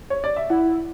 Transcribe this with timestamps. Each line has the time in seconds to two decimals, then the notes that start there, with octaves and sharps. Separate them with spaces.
0.10 C#5
0.24 D5
0.36 E5
0.50 E4 F#5